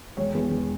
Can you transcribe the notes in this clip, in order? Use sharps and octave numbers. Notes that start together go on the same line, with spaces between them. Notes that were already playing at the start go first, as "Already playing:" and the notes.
E1 C#5
E2
E1